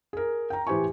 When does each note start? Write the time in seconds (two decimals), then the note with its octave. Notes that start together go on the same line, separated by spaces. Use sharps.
0.13 G#4 A#4
0.50 G5 A#5
0.67 A2 E3 G4 C5 G#5 C#6